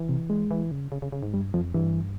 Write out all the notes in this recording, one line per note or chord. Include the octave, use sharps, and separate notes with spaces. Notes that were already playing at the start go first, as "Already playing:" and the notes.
Already playing: E3
C3
G#3
E3
C#3
C#3
C#3
C#3
G#2
G2 G3
F2 F3
G2 E3